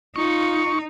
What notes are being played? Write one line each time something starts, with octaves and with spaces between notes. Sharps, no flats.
D#4 F4 C#6